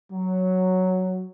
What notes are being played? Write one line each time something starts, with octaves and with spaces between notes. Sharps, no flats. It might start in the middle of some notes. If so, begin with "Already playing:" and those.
F#3